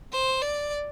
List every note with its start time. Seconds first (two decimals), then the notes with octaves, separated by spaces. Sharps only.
0.12 C5
0.42 D5